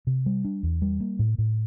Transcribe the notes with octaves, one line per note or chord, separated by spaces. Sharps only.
C3
G3
D4
E2
G3
A#3
A2
A2